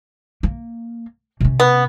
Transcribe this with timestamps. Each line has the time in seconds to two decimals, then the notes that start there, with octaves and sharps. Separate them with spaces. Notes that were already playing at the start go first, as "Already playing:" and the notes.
0.43 A#3
1.40 C3 C#4
1.60 B3